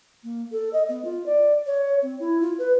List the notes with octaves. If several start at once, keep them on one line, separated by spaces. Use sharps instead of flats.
A#3
A4
D#5
B3
F4
D5
C#5
C4
E4
F4
B4